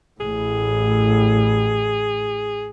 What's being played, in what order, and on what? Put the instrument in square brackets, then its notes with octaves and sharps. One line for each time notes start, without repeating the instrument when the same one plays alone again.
[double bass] A1 A2 [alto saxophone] G#4